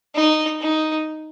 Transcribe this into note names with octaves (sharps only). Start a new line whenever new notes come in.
D#4
D#4